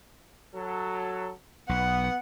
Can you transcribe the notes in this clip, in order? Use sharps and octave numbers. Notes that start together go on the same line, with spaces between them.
F#3 A4
B1 B3 F#5